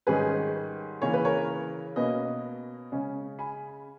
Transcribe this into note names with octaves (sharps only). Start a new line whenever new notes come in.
G#2 D#3 G3 C#4 G#4 B4
C#3 E3 A#3 C#4 C#5
B4
A#4 C#5
B2 A#3 C#4 B4 D#5
C#3 G#3 C#4
G#5 B5